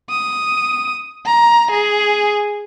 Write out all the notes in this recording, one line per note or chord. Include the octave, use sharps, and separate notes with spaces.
D#6
A#5
G#4